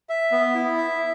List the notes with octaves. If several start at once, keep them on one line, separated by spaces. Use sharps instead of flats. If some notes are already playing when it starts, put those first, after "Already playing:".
E5
B3
E4
E5